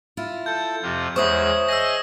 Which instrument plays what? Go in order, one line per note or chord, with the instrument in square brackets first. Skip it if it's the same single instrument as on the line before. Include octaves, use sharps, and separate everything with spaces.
[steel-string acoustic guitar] E4 F4
[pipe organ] A4 [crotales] G6
[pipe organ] F2 C3 F4
[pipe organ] E2 G#3 [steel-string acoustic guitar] C5 C#5 E5 [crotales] C#6 D#6
[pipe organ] G#4 D#5 [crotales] E6 A#6